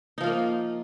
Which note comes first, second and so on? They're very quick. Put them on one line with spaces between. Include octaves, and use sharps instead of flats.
D#4 F3 F4 A#3